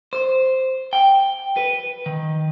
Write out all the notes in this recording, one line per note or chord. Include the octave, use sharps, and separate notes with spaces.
C5
G5
B4
D#3